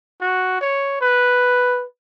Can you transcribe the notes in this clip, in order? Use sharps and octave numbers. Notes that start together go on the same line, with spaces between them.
F#4
C#5
B4